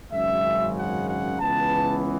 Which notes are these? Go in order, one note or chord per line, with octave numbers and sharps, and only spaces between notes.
G#1 F#2 C#3 G#3 E5
F#5
F#5
C#2 C#3 E3 B3 A5